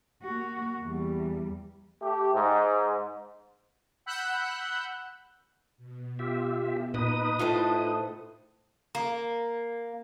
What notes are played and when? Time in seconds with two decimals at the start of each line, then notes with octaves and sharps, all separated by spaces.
0.23 A#3 F#4
0.82 E2 G3
2.02 A3 G4
2.33 G#2
4.06 F#5 B5 E6 F#6 G6
5.78 B2
6.19 F4 G4 E5
6.94 A#2 D#4 B4 D#6
7.39 A2 E4 F4 A4 C5
8.95 A#3